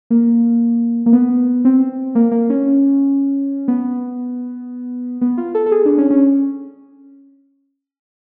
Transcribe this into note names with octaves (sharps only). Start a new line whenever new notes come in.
A#3
A#3
B3
C4
A#3
A#3
C#4
B3
B3
F4
A4
A4
G#4
D4
C#4
C#4